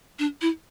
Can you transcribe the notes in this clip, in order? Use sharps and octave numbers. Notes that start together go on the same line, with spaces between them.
D4
E4